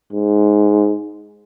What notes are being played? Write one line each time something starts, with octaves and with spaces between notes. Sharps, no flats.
G#2